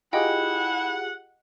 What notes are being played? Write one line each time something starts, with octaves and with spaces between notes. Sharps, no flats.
E4 F4 G4 G#4 D#5 F#5 G5